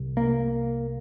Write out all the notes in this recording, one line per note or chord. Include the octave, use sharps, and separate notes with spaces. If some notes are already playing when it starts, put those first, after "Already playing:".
Already playing: C2 C3
A#3